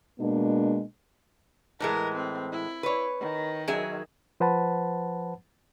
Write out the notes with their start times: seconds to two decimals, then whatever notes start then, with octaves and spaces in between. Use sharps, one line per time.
0.20 B2 G#3 A#3 D4
1.80 A2 E3 G#3 A#4
2.15 C4
2.52 E4
2.83 B4 C#5
3.20 D#3
3.68 F#3 G#4 E5
4.40 F3 B4 C5 F#5 A5 B5